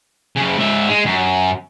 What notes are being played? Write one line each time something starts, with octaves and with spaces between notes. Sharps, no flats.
F#2 C#3
G#2 E5
G#3
F#2